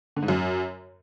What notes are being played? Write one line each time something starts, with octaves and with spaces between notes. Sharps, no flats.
D3
G#2
F#2